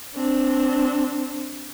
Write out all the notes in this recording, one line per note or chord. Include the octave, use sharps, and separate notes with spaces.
C4 D4